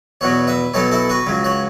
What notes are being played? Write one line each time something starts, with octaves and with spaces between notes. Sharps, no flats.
E2 B2 F#3 C#5 F#5
B4 E5
B1 B2 F#3 A4 C#5
E4 A4
F#4 B4
C#2 C#3 F#3
C#5 F#5